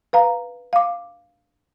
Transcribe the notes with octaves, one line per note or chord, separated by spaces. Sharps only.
B4 F5 A#5
F5 D6